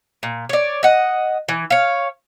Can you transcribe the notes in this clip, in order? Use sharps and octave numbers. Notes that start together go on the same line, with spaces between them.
A#2
C#5 D5
D#5 F#5
E3
C#5 F5